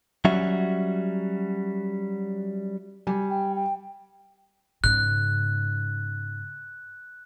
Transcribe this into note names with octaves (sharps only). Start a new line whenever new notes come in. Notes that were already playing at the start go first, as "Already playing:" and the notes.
F#3 G3 C#4 F#4 E5
G3 G#5
G5
G5
G#2 C#3 F#6